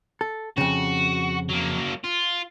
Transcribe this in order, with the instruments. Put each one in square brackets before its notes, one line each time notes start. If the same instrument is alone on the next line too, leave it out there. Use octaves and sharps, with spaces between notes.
[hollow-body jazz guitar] A4
[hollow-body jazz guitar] F2 C#3 [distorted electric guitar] F#4
[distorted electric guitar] F#3 A#3
F4